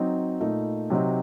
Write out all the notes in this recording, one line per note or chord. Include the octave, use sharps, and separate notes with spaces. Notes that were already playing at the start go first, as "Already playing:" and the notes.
Already playing: F#3 C4 D#4
A#2 A3 D#4
C3 F#3 C4 D#4